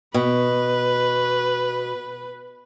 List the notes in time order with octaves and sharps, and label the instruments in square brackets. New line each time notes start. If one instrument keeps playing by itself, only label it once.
[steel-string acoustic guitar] B2 [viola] B4